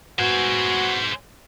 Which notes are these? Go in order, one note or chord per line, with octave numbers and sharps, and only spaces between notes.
B3 F#4 G#4 C5